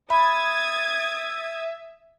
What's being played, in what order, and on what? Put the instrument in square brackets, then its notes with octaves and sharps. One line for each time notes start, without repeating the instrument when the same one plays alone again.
[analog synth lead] E5 [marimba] B5 [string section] D#6 G#6 A6